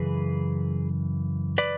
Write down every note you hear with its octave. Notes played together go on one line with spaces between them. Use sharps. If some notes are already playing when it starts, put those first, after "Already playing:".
Already playing: F#2 C#3 E3 G#4 B4
B4 D5